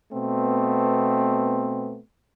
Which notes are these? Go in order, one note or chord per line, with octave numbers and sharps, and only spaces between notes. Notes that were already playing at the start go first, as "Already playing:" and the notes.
B2 A3 B3 C4